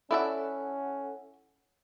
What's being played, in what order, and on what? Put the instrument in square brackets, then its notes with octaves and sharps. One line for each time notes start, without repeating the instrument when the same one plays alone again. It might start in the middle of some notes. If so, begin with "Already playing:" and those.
[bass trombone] C#4 [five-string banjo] E4 D5 E5 [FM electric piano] A4 F#5